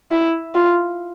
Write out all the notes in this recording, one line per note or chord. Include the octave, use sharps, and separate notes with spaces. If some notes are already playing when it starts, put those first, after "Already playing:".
E4
F4